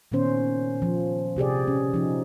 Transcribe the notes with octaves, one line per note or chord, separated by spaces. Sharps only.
A#2 D#3 B3 C#4 C5
F3
C3 G4 G#4 D5
C#4
F3 D#4